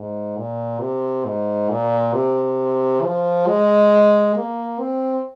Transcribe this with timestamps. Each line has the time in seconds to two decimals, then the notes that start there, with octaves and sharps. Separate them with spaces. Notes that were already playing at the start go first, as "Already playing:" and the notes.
Already playing: G#2
0.37 A#2
0.80 C3
1.25 G#2
1.70 A#2
2.14 C3
3.03 F3
3.47 G#3
4.36 A#3
4.79 C4